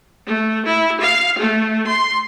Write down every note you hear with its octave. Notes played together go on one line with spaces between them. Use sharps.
A3
E4
F5
A3
C6